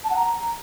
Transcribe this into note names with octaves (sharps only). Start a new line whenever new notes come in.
A5
F#5
A#5